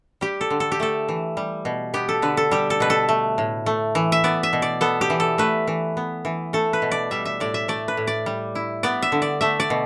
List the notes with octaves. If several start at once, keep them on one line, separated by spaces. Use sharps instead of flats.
G3 G4
A4
D3
A4
G4
A3 A4
E3
G3
B2
B3 G4
A4
D3 B4
A4
G3 G4
A4
B2 B4
A4
A3
A2
A3
E3
E5
B3 D5
E5
B2
D5
B3 A4
G4
E3
A4
A3 B4
E3
B3
E3
A3 A4
B4
B2
D5
G3 E5
E5
A2 D5
E5
A3 D5
B4
A2
D5
G3
E4
B3 D5
E5
D3
D5
A3 E5
D5
B2